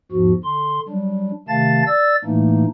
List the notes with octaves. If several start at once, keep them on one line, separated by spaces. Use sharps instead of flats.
E2 G#2 F3 F#4
D3 C6
F#3 G3 D4
C3 D#3 A3 F5 A5 A6
D5 E6 A6
A2 E3 A3 A#3 D4 D#4